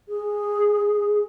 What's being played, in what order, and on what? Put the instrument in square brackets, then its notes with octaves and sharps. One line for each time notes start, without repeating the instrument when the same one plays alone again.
[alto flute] G#4